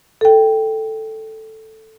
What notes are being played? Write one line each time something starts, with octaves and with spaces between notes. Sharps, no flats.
A4 G5